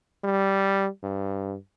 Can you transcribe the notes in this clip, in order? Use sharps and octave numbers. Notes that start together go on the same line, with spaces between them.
G3
G2